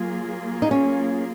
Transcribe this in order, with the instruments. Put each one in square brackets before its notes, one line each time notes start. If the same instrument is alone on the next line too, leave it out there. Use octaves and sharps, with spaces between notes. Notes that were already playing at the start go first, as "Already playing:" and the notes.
Already playing: [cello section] F#3 A#3 F4 G#4
[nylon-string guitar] D#4
C#4